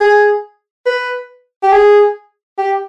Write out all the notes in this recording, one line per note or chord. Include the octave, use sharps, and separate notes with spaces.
G#4
B4
G4
G#4
G4